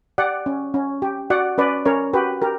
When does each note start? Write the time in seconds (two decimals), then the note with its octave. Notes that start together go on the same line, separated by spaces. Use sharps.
0.18 G4 D5 F#5
0.46 C#4
0.74 C#4
1.02 G4
1.30 F#4 D5 F#5
1.58 C#4 B4 D5
1.85 C#4 A#4 C#5
2.13 F#4 G4 B4
2.42 G4 A#4